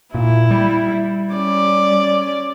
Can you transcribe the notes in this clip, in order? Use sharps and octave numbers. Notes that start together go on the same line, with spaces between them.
A#2 E4
G3
C#4 D5